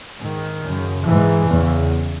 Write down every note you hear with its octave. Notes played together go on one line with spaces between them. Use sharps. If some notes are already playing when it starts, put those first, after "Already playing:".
G#2 D#3
F#2 C#3
G#2 E3
E2 C#3